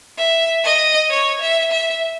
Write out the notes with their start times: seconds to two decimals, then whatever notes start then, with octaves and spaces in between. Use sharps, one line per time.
0.17 E5
0.64 D#5
1.10 C#5
1.41 E5
1.71 E5